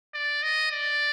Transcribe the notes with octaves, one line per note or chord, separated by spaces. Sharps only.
D5
D#5
D5